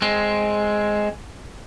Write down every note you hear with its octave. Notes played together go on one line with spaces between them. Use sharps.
G#3 C4